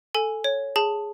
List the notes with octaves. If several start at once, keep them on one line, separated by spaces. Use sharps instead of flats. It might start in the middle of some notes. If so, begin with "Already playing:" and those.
A4 G#5
C#5
G#4 A5